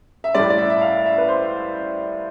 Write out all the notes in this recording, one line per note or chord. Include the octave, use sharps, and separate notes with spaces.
E5
A2 G3 D5
D5
E5
E5
F5
E5
B4
C5